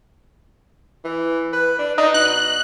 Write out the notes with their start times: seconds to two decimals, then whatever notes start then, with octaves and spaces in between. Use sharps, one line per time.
1.04 E3
1.53 B4
1.79 D4
1.98 D4 D#4
2.14 B2 F#6